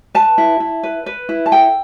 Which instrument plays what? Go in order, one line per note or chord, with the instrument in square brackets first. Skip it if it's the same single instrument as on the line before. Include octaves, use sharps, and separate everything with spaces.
[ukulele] B4 A5
E4
E4
B4
B4
E4
A5
A4 G5